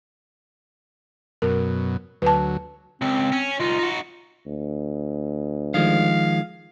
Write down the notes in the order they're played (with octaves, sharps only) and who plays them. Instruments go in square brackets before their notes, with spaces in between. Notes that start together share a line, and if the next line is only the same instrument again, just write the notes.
[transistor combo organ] F#2 B2 [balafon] A#4
[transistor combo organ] D2 F#3 [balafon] B4 A5
[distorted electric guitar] C#2 [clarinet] C4
[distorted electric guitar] C#4
[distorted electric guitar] C2 D#4 [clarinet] F4
[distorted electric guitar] D#4 F#4
[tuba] D2
[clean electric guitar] D#3 F3 G#3 [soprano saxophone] F5